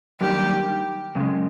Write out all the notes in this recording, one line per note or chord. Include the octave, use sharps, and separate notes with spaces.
F#2 D#3 G3 A#3 D4 G4
F#2 C#3 G#3